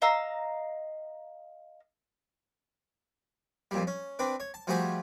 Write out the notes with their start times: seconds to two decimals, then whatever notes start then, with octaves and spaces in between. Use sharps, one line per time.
0.02 D#5 F5 A#5 E6
3.71 F2 A#2 G3
3.87 C#4
4.19 C4 D4 B4
4.40 C#5
4.54 A5
4.67 F3 G3 A3 F#4 G#4 C5